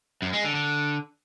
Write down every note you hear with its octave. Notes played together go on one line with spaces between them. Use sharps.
F#2
G#3
D3
D3